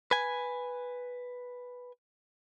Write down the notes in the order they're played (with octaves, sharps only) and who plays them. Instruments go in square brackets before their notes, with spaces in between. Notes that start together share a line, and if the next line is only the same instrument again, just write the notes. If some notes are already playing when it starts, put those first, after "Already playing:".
[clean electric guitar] B4 G#5